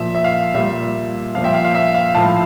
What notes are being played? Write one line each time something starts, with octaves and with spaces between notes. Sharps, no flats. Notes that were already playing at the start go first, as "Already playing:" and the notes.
Already playing: A#2 F3 E5
E5
F5
A#2 G3 E5
A#2 F3 F5
E5 G5
F5
F5
E5
F5
A2 F3 F5 A5